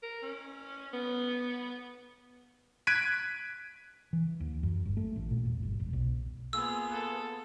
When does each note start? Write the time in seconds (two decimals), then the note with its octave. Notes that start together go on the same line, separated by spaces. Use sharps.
0.03 A#4
0.23 C#4
0.93 B3
2.87 F#6 G#6 B6 D7 D#7
4.13 E3
4.40 D#2
4.63 F#2
4.85 G1
4.97 A3
5.16 A1
5.31 A#2
5.46 E1
5.63 G1
5.80 E1
5.93 B1
6.53 A#3 B3 F4 G#4 E6
6.92 A4